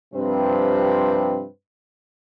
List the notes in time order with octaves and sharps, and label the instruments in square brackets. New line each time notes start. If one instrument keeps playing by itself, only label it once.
[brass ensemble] G2 C3 F3 C4 B4